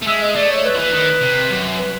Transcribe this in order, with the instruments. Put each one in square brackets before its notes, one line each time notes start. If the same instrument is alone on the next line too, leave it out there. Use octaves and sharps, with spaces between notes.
[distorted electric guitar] A3
[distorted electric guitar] G#3 [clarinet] E5
[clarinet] D#5
[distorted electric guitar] A3 [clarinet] D5
[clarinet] C#5
B4
[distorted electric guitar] F3
E3
D#3
C3
F#2
[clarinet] B4